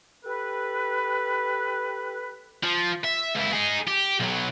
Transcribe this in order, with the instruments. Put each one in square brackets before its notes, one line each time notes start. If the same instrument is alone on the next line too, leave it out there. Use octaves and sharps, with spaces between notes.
[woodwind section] G4 A4 B4
[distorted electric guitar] F3
E5
C#2 E4
D#4 G#4
G4
B1 F#3